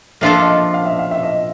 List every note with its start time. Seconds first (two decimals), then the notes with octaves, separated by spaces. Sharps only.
0.21 F3 A#3 D4 F4 A4 E5
0.42 D#5
0.74 F5
0.86 E5
0.99 F5
1.11 E5
1.23 D#5